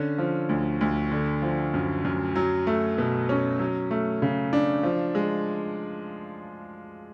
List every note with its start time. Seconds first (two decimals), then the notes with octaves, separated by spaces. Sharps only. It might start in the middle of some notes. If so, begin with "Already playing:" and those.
Already playing: D3 C#4
0.18 F3
0.49 D2
0.81 D2
1.12 D3
1.42 F3
1.74 F#2
2.05 F#2
2.35 F#3
2.67 A3
2.98 B2
3.29 C#4
3.59 F#3
3.91 A3
4.22 C#3
4.53 D4
4.83 F3
5.15 G#3